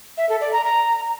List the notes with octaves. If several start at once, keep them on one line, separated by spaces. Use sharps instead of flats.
E5
A4
D5
A#5
A#5